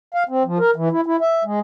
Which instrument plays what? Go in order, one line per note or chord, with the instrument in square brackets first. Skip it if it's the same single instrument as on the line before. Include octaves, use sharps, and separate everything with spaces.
[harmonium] F5
C4
F3
A#4
E3
E4
E4
E5
G#3